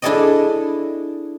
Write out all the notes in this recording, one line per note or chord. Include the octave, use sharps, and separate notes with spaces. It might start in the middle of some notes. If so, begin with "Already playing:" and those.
D4 E4 G#4 A4 D5 D#5